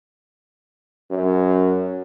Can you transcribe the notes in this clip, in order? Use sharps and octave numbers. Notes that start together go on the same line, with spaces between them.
F#2